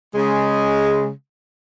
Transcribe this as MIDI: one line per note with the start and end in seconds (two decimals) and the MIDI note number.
0.14 1.09 49
0.14 1.09 56